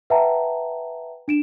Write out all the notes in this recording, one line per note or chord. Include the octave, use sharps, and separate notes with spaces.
B4 E5 F#5 G5 A5 A#5
D4 D7 E7